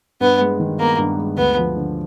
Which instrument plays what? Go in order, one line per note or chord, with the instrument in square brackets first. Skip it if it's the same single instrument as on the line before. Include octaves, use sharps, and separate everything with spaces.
[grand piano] G2 [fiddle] B3
[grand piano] G#3
D#3
[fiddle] A#3 [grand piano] B3
[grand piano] G2
G#3
[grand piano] D2 [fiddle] B3
[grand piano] F3
D3